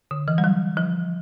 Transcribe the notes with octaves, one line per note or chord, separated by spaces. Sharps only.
D3
E3
G3
F#3
F3